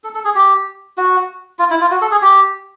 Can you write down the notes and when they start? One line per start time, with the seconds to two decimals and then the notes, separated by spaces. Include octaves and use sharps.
0.04 A4
0.15 A4
0.25 G#4
0.35 G4
0.98 F#4
1.59 F4
1.70 E4
1.81 F4
1.91 F#4
2.02 A4
2.12 G#4
2.22 G4